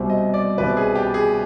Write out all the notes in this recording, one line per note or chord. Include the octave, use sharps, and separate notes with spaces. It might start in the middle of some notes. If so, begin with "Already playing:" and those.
Already playing: C2 B2 G3 C4
D#5
D5
C2 B2 G3 C4 B4
G#4
G4
G#4